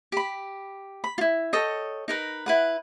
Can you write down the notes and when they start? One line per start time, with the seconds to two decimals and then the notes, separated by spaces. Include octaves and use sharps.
0.12 G4 B5
1.04 B5
1.18 E4 F4
1.53 A4 C#5 D#5 G5
2.08 D#4 A#4 B4
2.46 E4 B4 F#5